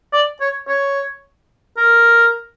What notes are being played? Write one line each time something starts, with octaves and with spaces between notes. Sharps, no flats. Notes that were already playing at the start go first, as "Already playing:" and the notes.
D5
C#5
C#5
A#4